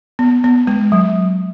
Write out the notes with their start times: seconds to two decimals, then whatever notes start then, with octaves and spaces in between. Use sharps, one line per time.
0.19 B3
0.44 B3
0.67 G#3
0.92 F#3